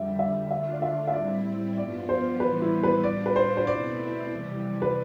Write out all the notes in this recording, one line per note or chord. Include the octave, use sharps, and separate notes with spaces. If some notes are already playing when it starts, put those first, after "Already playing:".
Already playing: F2 D3 G3 D5 E5
E5
D3 A3 D4 F4 E5
D5
E5
E5
A2 G3 C4 E4 D5
G2 F3 B3 F4 D5
C5
A2 E3 G3 B3 B4
E4
B4
A2 G3 D4 F4 D5
B4
C5
C5
B2 A3 C4 E4 D5
F2 C3 E3 G3
B4